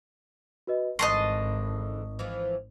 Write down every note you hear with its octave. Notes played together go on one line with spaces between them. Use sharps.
F#4 B4 D#5
G#1 G#2 D3 E3 D#5 A5 C6 C#6
E3 F3